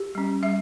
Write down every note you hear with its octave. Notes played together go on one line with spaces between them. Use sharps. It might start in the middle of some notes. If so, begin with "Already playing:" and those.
Already playing: G4
G3 C#4
G3 E5